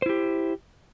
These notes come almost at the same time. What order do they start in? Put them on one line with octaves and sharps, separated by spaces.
C5 E4 G4